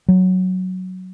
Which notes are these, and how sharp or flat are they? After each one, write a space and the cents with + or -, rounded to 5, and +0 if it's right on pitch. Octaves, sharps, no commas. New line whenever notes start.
F#3 +0